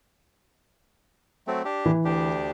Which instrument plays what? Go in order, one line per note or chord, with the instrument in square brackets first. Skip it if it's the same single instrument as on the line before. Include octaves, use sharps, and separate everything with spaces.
[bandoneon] F#3 A3 C4
D4 G4
[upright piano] E3
[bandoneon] D2 D4 G4